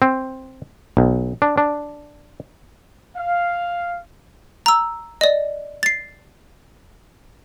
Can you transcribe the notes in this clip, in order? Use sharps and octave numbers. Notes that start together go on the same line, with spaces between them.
C4
B1
D4
D4
F5
A#5 E6
D5 D#5
A6 C7